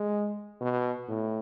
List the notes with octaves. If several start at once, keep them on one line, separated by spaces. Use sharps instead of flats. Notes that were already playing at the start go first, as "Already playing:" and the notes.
Already playing: G#3
B2
A2